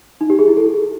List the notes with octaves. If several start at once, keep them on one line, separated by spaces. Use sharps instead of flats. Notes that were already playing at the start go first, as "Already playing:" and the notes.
D#4
G4
G#4
E4
A4